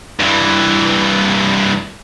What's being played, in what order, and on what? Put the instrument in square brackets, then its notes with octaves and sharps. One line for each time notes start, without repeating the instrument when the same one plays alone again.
[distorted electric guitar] G2 E3